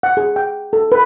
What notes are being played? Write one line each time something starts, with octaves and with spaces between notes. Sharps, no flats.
F#5
G#4
G5
A4
B4